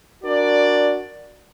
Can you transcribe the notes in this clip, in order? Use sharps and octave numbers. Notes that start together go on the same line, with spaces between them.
D4 F#4 A#4 D5